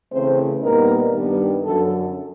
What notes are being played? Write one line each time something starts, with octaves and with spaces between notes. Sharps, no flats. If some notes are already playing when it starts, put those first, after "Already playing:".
C#3 E3 A3 C4 C5
A#2 G3 B3 D#4 A#4
G2 D#3 G3 B3
F#2 D3 F#3 A4